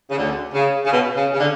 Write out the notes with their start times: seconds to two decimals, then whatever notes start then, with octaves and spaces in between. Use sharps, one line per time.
0.11 C#3
0.18 D2 D3
0.54 C#3
0.86 C#3
0.92 B2
1.17 C#3
1.34 C#3
1.40 D3